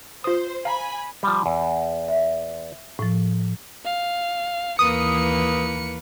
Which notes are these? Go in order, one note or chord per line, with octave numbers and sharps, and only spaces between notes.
F4 C5 D#6
F5 G#5 A#5 B5
F3 G3
E2
E5
A2 F3
F5
D#2 E3 A#3 B4 D#6 C#7